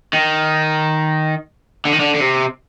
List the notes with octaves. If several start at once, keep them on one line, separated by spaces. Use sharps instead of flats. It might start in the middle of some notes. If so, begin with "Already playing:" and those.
D#3
D3
D#3
D3
D3
C3